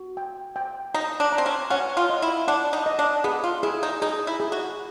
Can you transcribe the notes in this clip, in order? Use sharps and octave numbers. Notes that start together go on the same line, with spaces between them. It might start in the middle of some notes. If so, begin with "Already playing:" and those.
Already playing: F#4
G5
G5
D#4 A#5
D4
A#5
C4
C#4
C#4 F#5
F4
D#5
E4
D4 F#5
D#4
D#5
D4
B3 G#4
F4
E4 G#4
D#4
D#4 G#4
E4
G#4
F#4